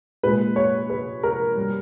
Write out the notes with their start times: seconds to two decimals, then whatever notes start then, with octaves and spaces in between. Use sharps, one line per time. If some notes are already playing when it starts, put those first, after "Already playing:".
0.23 A#2 G#3 B4
0.56 C#5
0.90 B4
1.23 A#4
1.56 G2 G3